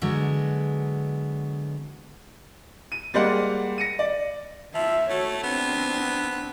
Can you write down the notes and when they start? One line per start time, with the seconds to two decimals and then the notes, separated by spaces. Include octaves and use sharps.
0.02 D3 F#3 G#3 B3
2.92 D#7
3.14 G3 G#3 A#3 C5 D5 F#5
3.78 A#6 C#7 D#7
3.99 D5
4.75 F3 E5
5.10 A3 F#4 C#5
5.43 B3 C4 D4